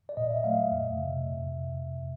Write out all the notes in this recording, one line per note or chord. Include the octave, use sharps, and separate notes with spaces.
D5
A#2 D#5
E5
F#3 A3 F5
E5
F2
C3